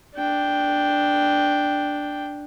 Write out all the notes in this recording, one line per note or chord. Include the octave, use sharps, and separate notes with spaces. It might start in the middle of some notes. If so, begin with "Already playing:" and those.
D4 G5